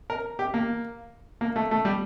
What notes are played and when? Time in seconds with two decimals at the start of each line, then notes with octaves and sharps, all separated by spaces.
0.10 A#4
0.39 G4
0.54 A#3
1.41 A#3
1.56 A3
1.71 A3
1.85 G3